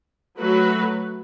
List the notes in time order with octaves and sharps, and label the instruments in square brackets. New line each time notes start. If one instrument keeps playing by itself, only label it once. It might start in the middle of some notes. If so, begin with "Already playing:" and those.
[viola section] F#3 A3 F#4 B4